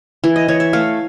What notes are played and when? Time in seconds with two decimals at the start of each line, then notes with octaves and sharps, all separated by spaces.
0.24 E3
0.36 D#5
0.48 E3 C#5
0.60 E5
0.73 A3 F5